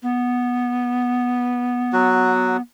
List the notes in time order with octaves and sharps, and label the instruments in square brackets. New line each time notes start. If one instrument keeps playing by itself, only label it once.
[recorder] B3
[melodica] F#3 F#4